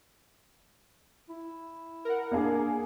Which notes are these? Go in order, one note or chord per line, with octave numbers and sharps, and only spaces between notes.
E4
A#4 F#5
A#3 D4 G#4